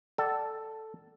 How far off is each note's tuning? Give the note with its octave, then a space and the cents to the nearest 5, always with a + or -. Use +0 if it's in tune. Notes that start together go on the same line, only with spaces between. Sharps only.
A4 +0 D5 +0 F#5 +40